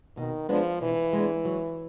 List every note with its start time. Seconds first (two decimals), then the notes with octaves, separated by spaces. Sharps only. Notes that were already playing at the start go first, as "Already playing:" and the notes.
0.17 B2 D#3
0.49 F3 G#3 B3 D4
0.81 B2 E3
1.13 G#3 B3 D4
1.45 F#3